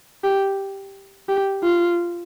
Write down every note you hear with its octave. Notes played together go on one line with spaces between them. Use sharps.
G4
G4
F4